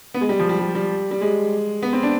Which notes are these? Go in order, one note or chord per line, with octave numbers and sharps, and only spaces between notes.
B3
G#3
G3
F3
G3
G3
G3
G3
G#3
B3
C4
D4